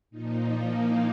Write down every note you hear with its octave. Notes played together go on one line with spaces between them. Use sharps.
A#2 F3 D#4
A#3